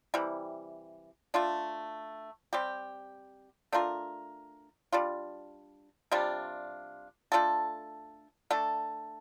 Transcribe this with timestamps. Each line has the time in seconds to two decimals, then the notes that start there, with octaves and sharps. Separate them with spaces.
0.14 C3 E3 G3
1.34 A3 D4 F4
2.53 G3 C4 G4
3.72 A3 D4 F4 A#4
4.92 G3 D4 F4
6.12 C3 G3 D4 F4
7.32 A3 D4 F4 A4
8.51 A3 D4 A4